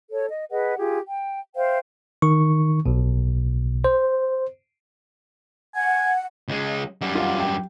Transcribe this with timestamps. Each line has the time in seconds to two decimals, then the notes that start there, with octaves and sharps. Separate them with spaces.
0.11 A4 C#5
0.29 D#5
0.51 G#4 B4 D#5 F#5
0.77 F4 G4 G#4
1.08 G5
1.55 C5 E5 F5 G5
2.22 D#3 C#6
2.86 B1 B2
3.84 C5
5.75 F#5 G#5
6.48 C#2 G#3
7.01 F#2 G3
7.15 F4 F#5
7.40 G5